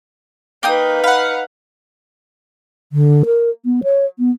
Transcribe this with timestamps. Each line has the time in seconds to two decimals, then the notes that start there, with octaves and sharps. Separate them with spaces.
0.63 A#3 D#4 B4 G5 D#6
1.04 F5 F#5 B5
2.93 D3
3.26 A#4
3.65 B3
3.84 C#5
4.19 B3